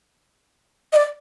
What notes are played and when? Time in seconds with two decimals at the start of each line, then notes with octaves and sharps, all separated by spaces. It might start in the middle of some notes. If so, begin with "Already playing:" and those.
0.93 D#5
0.96 D5